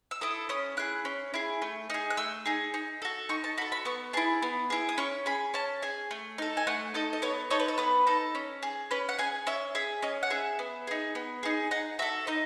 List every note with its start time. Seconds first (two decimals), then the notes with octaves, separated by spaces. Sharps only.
0.11 E6
0.21 E4 A4 D#6
0.49 C#4 D#6
0.77 E4 G#4 F#6
1.05 C#4
1.34 E4 G#4
1.62 A3
1.90 D#4 G#4
2.10 F#6
2.17 A3 E6
2.46 D#4 G#4
2.74 D#4
3.02 F#4 A4
3.29 D#4 C#6
3.44 A5
3.58 F#4 B5
3.62 A4
3.72 B5
3.85 B3 C#6
4.13 E4 G#4 A5
4.42 B3
4.70 E4 G#4
4.89 D#6
4.98 C#4 C#6
5.26 G#4 B5
5.54 C#4 A5
5.82 G#4 G#5
6.11 A3
6.38 D#4 A4
6.57 G#5
6.67 A3 F#5
6.94 D#4 A4 D#5
7.13 D#5
7.22 B3 C#5
7.50 D#4 A4 C#5
7.60 B4
7.68 A4
7.78 B3 B4
8.07 D#4 A4
8.35 C#4
8.63 G#4
8.91 C#4 B4
9.09 F#5
9.18 G#4 G#5
9.47 C#4 E5
9.75 G#4 E5
10.02 C#4 D#5
10.23 F#5
10.30 G#4 E5
10.59 B3
10.87 D#4 G#4
11.15 B3
11.43 D#4 G#4
11.71 D#4 F#5
11.99 F#4 A4 E5
12.27 D#4 D#5